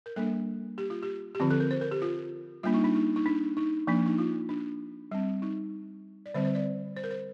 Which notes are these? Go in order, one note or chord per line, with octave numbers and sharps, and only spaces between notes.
A#4
G3 A#3 D4 A4
G4
F4
G4
G4
D3 F3 C4 F4
A4
A#4
C5
A#4
G4
F4
G3 A#3 D4 F4
D#4
D4
D#4
D#4
D4
D#4
F3 A#3 D4
D#4
F4
D4
G3 C4
D#4
D5
D3 G3 C4 C5
C5
D5
C5
A#4
C5